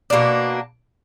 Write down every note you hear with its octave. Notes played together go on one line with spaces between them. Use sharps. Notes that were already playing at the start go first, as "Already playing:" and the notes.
B2 A#3 D4